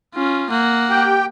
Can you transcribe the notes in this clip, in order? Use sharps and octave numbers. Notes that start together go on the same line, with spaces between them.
C#4 F4
A#3 F#5
G4 G5